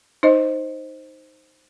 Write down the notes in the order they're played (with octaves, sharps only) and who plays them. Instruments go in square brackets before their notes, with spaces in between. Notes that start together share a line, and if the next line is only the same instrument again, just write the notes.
[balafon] D#4 C5 D#5